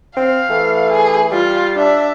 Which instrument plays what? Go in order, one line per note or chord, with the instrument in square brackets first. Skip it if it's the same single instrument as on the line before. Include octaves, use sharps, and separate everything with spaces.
[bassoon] C4 [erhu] F5
[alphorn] E3 [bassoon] A3
[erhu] G#4
[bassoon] G3 [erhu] F4
[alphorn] D4 [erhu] E5